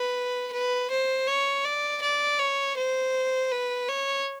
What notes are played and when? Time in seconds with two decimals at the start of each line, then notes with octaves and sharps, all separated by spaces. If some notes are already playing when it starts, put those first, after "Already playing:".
Already playing: B4
0.53 B4
0.90 C5
1.28 C#5
1.65 D5
2.02 D5
2.39 C#5
2.77 C5
3.52 B4
3.89 C#5